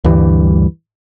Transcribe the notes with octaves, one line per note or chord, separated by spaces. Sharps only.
D2 G2 E3 G3